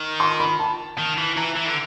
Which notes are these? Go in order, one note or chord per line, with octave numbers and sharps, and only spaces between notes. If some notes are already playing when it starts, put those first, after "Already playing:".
Already playing: D#3
C6
B5
A5
D#3
E3
E3 A#5
E3
D3